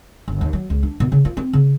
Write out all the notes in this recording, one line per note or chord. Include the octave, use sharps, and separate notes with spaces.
G1
D#2
F#3
C#2
D4
B2
C#3
F4
C4
C#3